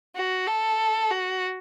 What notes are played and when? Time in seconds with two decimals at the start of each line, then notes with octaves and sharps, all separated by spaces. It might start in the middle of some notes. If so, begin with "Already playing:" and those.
0.16 F#4
0.47 A4
1.11 F#4